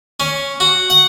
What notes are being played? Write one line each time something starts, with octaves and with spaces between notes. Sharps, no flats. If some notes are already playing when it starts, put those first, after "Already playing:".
C#4
F#4
F#5